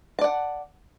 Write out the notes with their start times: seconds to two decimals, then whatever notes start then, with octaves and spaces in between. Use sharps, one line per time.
0.19 A5
0.21 D5
0.24 F#5